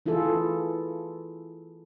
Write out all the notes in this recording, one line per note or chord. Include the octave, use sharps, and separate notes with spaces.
E3 E4 F4 G#4 A4